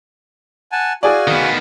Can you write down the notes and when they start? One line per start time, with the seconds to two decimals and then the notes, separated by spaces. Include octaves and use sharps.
0.72 F#5 G#5 A5
1.03 F#4 G#4 D5 F5 G#5
1.28 D#3 B3